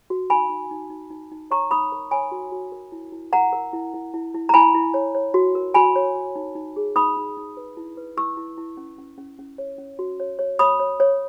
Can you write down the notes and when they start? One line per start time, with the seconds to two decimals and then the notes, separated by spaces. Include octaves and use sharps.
0.10 F#4
0.30 D#4 G#5 B5
0.50 D#4
0.71 D#4
0.90 D#4
1.11 D#4
1.32 D#4
1.51 C#5 A#5 C#6
1.71 D#4 B5 D#6
1.92 A#4
2.11 C#5 G#5 B5
2.31 F#4
2.52 F#4
2.72 A#4
2.92 E4
3.12 E4
3.33 A#4 F#5 A#5
3.53 A#4
3.73 E4
3.94 E4
4.14 E4
4.34 E4
4.49 A#5
4.54 E4 G#5 B5
4.75 E4
4.94 C#5
5.15 C#5
5.34 F#4
5.55 A#4
5.74 F#4 G#5 B5
5.96 C#5
6.15 F#4
6.36 D#4
6.55 D#4
6.76 G#4
6.96 D#4 B5 D#6
7.17 D#4
7.37 D#4
7.57 B4
7.77 E4
7.97 B4
8.17 E4 C#6 E6
8.37 E4
8.58 E4
8.77 C#4
8.98 C#4
9.18 C#4
9.39 C#4
9.58 C#5
9.78 C#4
9.99 F#4
10.20 C#5
10.39 C#5
10.59 C#5 B5 D#6
10.80 C#5
11.00 C#5